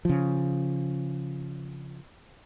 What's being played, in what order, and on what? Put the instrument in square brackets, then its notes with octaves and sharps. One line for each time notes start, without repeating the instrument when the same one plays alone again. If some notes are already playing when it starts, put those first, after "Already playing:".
[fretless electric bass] C#3 F3